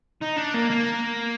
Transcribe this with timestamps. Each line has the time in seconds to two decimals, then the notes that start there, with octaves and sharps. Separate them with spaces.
0.21 D#4
0.37 D4
0.54 A#3
0.71 A#3